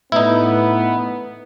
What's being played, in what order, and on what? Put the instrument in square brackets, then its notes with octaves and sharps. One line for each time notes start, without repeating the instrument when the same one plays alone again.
[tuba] A2 [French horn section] B3 [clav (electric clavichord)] D#4 E4